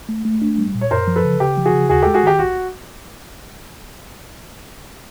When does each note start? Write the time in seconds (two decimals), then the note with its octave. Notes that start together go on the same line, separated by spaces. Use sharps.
0.09 A3
0.25 A3
0.42 D4
0.58 G3
0.75 A#2
0.81 C#5
0.91 F#2 A#4 C5
1.08 F3
1.16 A4 B4
1.25 C#3
1.40 C#3 G4
1.57 F3
1.66 F#4 G#4
1.74 C#3
1.89 D#2 F#4 G#4
2.03 G#3 G4 A4
2.14 F#4 G#4
2.23 D#3 G4
2.39 A#1 F#4